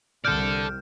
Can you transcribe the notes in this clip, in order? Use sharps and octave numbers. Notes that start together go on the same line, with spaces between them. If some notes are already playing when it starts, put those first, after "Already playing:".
C2 C3 A4 D5 F6 G6